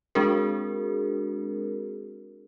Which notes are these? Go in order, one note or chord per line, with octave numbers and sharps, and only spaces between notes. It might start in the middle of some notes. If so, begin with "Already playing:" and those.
G#3 C4 D4 F#4 G#4 A#4